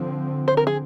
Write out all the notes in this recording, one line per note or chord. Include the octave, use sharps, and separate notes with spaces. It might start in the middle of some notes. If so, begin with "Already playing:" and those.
Already playing: D3 F3 C4
C5
A#4
G#4